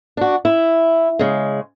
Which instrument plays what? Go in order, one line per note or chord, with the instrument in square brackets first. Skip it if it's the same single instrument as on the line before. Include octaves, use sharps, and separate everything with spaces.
[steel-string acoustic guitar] D4 F#4
E4
C#3 G#3